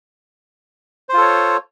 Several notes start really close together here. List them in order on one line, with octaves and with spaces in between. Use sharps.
C5 F4 A4 C#5